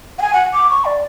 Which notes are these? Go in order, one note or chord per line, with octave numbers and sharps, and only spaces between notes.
F#5
G#5
F#5
D6
C#6
D5